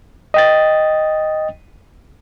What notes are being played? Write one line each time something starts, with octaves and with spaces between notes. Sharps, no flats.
D#5 G5 A6